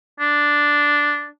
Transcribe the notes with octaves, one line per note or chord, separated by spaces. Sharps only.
D4